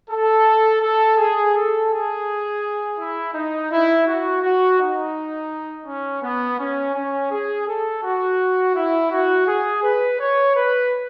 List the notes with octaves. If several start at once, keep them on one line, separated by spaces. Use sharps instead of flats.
A4
A4
G#4
A4
G#4
E4
D#4
E4
F#4
F#4
D#4
C#4
B3
C#4
C#4
G#4
A4
F#4
E4
F#4
G#4
B4
C#5
B4